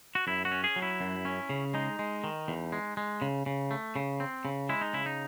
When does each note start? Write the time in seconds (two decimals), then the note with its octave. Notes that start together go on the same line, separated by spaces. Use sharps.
0.15 F#4
0.27 F#2 E4
0.45 F#4
0.52 C#4
0.64 G#4
0.76 F#3
0.82 E4
1.01 F#2
1.25 C#4
1.49 C#3
1.74 G#3 D#4
1.99 G#3
2.24 D#3
2.48 E2
2.72 G#3
2.97 G#3
3.22 C#3
3.46 C#3
3.71 A3
3.96 C#3
4.20 C4
4.45 C#3
4.69 G#3 E4
4.81 D#4
4.93 C#3 E4
5.06 D#4